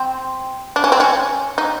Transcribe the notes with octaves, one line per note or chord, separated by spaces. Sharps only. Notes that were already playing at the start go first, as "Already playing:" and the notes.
Already playing: C4
D4
C#4
C4
C#4
D#4